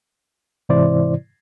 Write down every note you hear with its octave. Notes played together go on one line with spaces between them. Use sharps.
G#2 C3 E3 E4 C5 D5